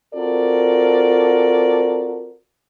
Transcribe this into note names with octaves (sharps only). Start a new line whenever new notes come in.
C4 F4 F#4 A4 A#4 D5